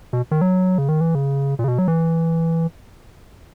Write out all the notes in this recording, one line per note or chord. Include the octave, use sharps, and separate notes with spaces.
B2
D#3
F#3
C#3
D#3
E3
C#3
A#2
C#3
B2
F#3
E3